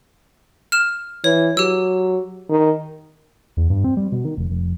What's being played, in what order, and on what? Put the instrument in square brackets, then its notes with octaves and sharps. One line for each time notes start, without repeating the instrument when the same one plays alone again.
[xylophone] F6 E7
[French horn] E3 [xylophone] C#5
[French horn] F#3 [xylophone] G4 E6
[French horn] D#3
[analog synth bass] E2
G2
C4
G3
B2
D#3
F1
F1